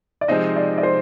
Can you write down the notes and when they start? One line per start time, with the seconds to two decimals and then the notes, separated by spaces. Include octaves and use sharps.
0.21 D5
0.28 C3 F3 G#3 C4 D#4 D#5
0.56 D5
0.78 D5
0.83 C5